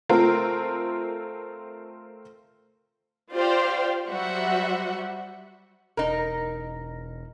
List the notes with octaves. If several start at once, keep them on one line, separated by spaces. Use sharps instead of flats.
A3 C4 F4 A#4
F4 G4 C5 D5 F5 G5
F#3 G3 F#4 C5 E5 F#5
E1 D#4 A#4